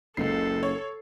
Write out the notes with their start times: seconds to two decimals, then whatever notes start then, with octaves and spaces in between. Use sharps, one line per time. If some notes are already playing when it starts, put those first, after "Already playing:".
0.17 F#1 C#2 A4 C7
0.63 C#5